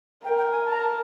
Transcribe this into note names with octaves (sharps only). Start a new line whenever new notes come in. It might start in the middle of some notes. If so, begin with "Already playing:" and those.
A#4 G5
G5
G#5
A5
A#5
A5